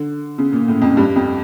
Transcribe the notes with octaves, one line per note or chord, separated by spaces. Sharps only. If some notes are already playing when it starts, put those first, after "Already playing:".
Already playing: D3
C#3
A#2
A2
F2
G2
F2